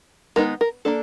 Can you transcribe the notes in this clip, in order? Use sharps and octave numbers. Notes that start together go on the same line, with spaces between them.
D#3 G#3 B3 D#4 A#4
A#4
A#3 D4 A4